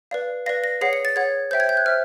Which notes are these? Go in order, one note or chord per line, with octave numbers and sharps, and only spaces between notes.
B4 D5 F5
B4 D5 F5 A#6
A#6
G#4 C#5 F#5 C7
C#7
A6
G#4 C#5 F#5 G#6
C5 E5 G5 G6
G#6
G6
F#6
C5 E5 F6